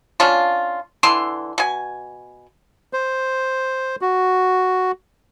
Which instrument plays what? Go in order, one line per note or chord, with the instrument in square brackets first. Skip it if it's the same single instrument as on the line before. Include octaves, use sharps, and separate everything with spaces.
[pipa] C#4 D4 F4
D3 E3 C6
B2 G#5
[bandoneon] C5
F#4